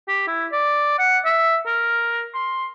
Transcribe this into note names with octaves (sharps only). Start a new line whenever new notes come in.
G4
E4
D5
F#5
E5
A#4
C6